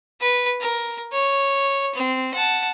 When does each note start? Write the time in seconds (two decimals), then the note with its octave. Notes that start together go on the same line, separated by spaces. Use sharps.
0.20 B4
0.61 A#4
1.12 C#5
1.95 C4
2.34 F#5 A5